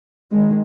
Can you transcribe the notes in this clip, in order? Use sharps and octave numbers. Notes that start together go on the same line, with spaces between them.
D#3 G#3